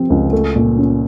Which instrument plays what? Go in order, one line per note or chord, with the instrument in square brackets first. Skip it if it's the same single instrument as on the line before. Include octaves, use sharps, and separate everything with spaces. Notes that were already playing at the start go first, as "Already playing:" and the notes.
Already playing: [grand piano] C3 F3 C4
C#2
A3
A#2
C#4